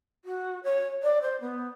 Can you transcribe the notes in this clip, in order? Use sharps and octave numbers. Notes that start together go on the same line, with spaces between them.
F#4
C#5
D5
C5
B3